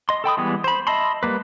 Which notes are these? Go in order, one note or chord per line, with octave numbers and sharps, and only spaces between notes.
D#5 C6
A4 G5 B5 D#6
E3 G3 G#3 B3
C5 B5
D#5 E5 A5 B5 C6
G3 A3 A#3 B4